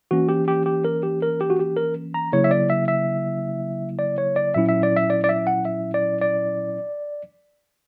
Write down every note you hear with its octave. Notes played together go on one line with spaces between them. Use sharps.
E3 A#3 C#4 F#4
G4
G4
G4
A#4
G4
A#4
G4
F#4
G4
A#4
A#5
C#3 F#3 A#3 E4 C#5
E5
D5
E5
E5
D5
C#5
D5
A#2 F#3 C#4 E4 E5
E5
D5
E5
D5
D5
E5
F#5
E5
D5
D5